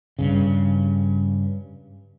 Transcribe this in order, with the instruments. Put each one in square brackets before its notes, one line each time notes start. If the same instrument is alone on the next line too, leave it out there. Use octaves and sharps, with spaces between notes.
[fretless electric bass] G2 C#3